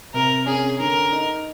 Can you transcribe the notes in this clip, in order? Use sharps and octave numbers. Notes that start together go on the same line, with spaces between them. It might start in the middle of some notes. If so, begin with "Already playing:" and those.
C3 A#4
C#4 G#4
D3 A#4
D#4